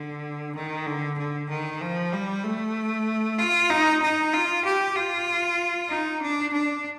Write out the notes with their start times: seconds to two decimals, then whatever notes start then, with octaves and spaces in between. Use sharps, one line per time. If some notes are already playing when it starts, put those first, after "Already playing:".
Already playing: D3
0.55 D#3
0.86 D3
1.18 D3
1.49 D#3
1.81 F3
2.12 G3
2.44 A3
3.38 F4
3.70 D#4
4.02 D#4
4.33 F4
4.65 G4
4.96 F4
5.90 D#4
6.22 D4
6.53 D4